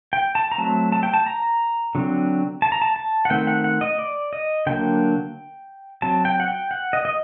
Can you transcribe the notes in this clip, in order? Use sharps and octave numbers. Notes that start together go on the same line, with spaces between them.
G5
A5
A#5
F#3 A3 C4 A5
A5
G5
A5
A#5
D3 F#3 C4
A5
A#5
A5
A5
F#5
D#3 A3 C4 G5
F#5
F#5
D#5
D5
D#5
D3 F#3 A#3 G5
F#3 C4 A5
G5
F#5
G5
F#5
D#5
D#5